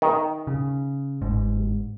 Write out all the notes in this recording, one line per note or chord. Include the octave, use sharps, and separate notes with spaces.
D#3
C#3
G1 G#2